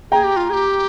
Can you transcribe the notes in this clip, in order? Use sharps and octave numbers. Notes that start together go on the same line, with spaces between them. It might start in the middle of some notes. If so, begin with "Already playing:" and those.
G#4 G5 A#5
G4
F4
G#4
G4